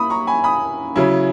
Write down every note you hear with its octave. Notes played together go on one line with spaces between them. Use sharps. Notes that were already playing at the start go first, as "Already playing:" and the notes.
Already playing: A#3 E4 B5 D#6
A#5 C#6
G#5 B5
B5 D#6
C#3 F#3 C#4 E4